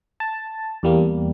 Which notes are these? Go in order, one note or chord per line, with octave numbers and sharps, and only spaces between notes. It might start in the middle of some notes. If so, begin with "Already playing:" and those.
A5
E2 G3 A#3